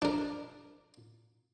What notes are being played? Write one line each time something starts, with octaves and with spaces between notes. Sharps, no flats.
D4 A#4